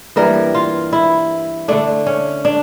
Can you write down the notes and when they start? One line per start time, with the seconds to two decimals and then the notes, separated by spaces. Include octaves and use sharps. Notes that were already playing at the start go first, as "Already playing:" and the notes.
0.16 G2 E3 G3 A#3 A#4
0.55 F4
0.93 E4
1.68 D3 A3 D4
2.07 C#4
2.45 D4